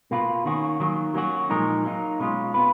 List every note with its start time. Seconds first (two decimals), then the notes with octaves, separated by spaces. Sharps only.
0.11 B2 A#3 F4 B4
0.45 D#3 A#3 C#4 F#4
0.80 D#3 F#3 A#3
1.14 F#3 A#3 C#4 F#4
1.50 A#2 F3 G#3 D#4 A#4
1.85 F#3 A#3 D#4
2.20 B2 G#3 C#4 F4
2.54 B3 F4 B4